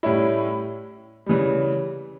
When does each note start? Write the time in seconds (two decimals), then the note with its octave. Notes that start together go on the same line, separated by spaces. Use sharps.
0.03 A2 G3 C#4 E4
1.26 C#3 E3 G3